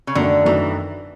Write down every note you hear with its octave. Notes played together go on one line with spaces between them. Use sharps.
C#3
F#2 D3 D#3 F#3 A3
F#2 D#3 E3 F#3 A3